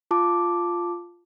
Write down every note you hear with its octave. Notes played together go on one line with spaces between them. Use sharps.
F4 A5 D6